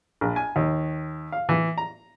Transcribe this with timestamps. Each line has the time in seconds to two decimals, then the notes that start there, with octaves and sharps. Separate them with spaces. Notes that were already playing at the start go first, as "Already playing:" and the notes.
0.21 A#1
0.36 G#5
0.56 D#2
1.32 F5
1.49 E3
1.78 A#5